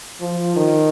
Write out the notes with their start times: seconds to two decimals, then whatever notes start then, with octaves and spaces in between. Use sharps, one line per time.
0.20 F3
0.56 D#3